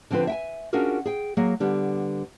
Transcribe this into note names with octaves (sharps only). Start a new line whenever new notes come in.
D3 F3 C4 F4 B4
E5 G5 G#5
C#4 D4 F4 F#4 G#4 A#4
G#4 G5
F#3 A#3 G#4
D3 G3 B3